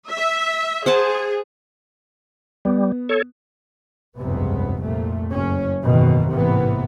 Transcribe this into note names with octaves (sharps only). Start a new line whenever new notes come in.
E5
G#4 C5 F#5 A5
G3 B3
A4 C#5
F1 C#2 G2 C3 B3
C2 F2 A#2 A3
F#1 C#4
F#1 G#2 B2 D#3 E3
A1 G#2 C3 E3 A#3 B3